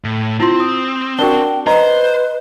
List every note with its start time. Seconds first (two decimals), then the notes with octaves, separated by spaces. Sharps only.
0.04 A2
0.40 C4 E4 F4 C6
0.60 D#6
1.19 D4 F#4 A#4 G5 G7
1.67 B4 C5 D#5 A#5